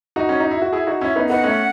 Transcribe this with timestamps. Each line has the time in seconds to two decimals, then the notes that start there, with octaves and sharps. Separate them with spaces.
0.16 D#4 F#4
0.29 C#4
0.40 D#4
0.51 E4
0.62 F#4
0.72 E4 G#4
0.87 D#4 F#4
1.01 C#4 E4
1.16 B3 D#4
1.29 B3 D#4 F#5
1.43 A3 C#4